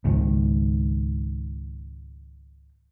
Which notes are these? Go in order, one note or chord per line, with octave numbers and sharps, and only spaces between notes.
C#2 G#2 D#3